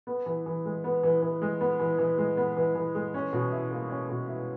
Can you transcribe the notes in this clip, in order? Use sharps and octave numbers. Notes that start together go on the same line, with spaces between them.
B3
E3
E3
G#3
B3
E3
E3
G#3
B3
E3
E3
G#3
B3
E3
E3
G#3
C#4
B2
E4
A#3
C#4
B2
E4